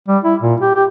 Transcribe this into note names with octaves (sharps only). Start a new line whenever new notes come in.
G3
E4
A#2
G4
G4